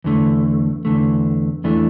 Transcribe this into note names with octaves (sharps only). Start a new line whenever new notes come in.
E2 D3 A3
E2 D3 A3
E2 E3 A3 D4